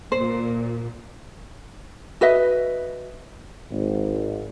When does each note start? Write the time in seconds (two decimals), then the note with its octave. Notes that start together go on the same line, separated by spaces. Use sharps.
0.12 A#2 C5
2.21 F#4 B4 D#5 E5
3.71 G#1